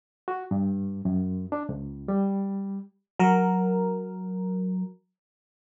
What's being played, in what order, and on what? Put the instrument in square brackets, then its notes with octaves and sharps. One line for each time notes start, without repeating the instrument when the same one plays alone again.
[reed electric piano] F#4
G2
F#2
D4
C#2
G3
[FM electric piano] F#3 A#4